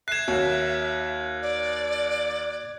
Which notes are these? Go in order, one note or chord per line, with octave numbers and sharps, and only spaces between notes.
E5 F#6 G#6 C7 E7
D#2 F#4 C#5
D5